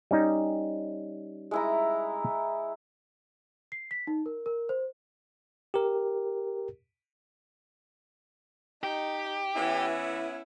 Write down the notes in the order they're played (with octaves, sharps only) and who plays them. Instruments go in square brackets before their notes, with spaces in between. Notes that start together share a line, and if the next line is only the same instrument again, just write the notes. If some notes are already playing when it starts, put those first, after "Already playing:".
[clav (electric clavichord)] G3 C#4 D#4
[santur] G#3 E4 A#5
[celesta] C7
B6
D#4
A#4
A#4
C5
[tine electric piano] G4 A#4
[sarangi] D#4 [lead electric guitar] G4
[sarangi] E3 [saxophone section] B3 C#4 E4